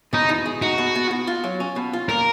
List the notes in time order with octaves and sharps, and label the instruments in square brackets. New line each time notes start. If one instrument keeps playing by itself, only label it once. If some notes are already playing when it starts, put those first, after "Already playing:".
[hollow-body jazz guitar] B2 [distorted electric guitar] D#4
[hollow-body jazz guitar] B2
G#3
[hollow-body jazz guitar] D#4 [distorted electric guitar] F#4
[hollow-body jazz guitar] B2
B2
B2
F4
F#3
C#4
B2
F4
[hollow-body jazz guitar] A#2 [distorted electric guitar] A#4